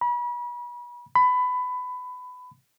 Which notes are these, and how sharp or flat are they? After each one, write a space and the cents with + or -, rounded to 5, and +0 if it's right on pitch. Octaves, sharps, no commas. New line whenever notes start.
B5 -35
B5 +20